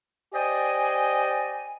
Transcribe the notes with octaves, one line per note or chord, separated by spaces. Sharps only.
G4 C5 D5 D#5 G5 G#5